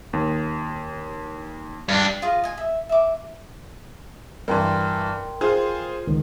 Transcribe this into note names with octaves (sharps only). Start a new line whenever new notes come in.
D#2
G2 D4
F4 G#4 D#5 F5
D#5 G#5
E5
E5 D6
G2 E3 A#4 G5 C6
F4 G#4 C5
C#2 D#3